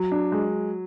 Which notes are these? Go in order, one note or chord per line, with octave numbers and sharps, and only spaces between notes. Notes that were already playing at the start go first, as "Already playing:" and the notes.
Already playing: F#3
D4
G#3